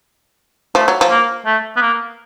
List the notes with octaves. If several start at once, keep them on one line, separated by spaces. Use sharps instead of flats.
F3 A3
F#3
F3
A#3
A3
B3
A#3